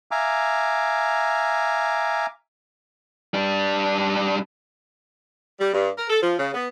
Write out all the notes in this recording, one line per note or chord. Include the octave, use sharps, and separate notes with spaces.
E5 F5 G#5 A#5 D6
G3 D4
G3
G2
A#4
A4
F3
C#3
B3